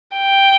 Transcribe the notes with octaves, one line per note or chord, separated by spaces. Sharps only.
G5